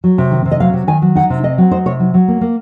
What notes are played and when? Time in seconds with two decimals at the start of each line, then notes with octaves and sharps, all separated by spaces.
0.04 F#3
0.18 C3
0.31 D#3
0.45 C3
0.51 D#5
0.60 F#3 F5
0.73 C3
0.87 D#3 G#5
1.02 F#3
1.15 D#4 F#5
1.30 C3
1.43 C4 D#5
1.58 F#3
1.71 D#4 C5
1.86 C3 C#5
2.00 F#3
2.14 F#3
2.28 A#3
2.41 A#3